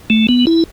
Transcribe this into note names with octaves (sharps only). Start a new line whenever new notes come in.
A3
B3
E4